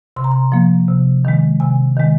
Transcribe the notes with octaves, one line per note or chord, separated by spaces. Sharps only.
C3 C6
A#5
C6
F3 A#3
C3
D#3 G#3
C3 G#5
D#3 G#3